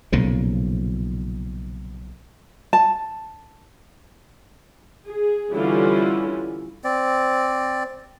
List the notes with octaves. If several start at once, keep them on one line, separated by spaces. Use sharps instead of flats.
B1 A#2 C#3 F3
A5
G#4
D3 E3 G3 C#4 E4 F4
C4 D5